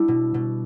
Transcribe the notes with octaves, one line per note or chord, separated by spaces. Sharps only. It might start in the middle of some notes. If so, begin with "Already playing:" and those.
Already playing: G3 D4 E4
B2
B2